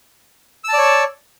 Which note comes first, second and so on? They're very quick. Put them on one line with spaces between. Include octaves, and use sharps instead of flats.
E6 A5 D5 C#5